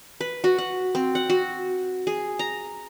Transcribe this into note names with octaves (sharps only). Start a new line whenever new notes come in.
B4
F#4
F#5
C4
F#5
F#4
G#4
A#5